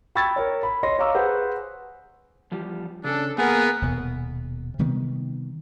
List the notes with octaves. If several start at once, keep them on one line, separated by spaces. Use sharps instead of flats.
G5 B5 C#6 E6 G#6 A6
A#4 C#5
B5
C#5 D#5 C6 A#6
C#5 F5 A#5 C#6 D6 E6
G#4 B4 C5 F#5
E2 F3 G3
C#3 C#4 D4 A4
A#3 B3 G#4 A#4 F#5
D#1 B2
C3 D#3 G3 B3